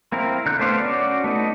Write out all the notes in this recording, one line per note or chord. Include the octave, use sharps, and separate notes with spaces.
A#3 C4 E4 A#4
D3 F#6 G6
A3 B3 C5 D5 F5
C#4 F#4 D5
A3 B3 D#4